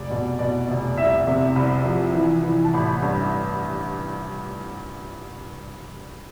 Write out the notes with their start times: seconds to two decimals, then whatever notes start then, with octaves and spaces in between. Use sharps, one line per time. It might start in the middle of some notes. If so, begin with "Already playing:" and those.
Already playing: F1 D5
0.10 B2
0.39 B2 D5
0.69 F1
0.97 C2 E5
1.27 C3
1.56 C2 B5
1.85 F3
2.14 E3
2.43 E3
2.64 A5
2.74 A1 B5
3.02 G2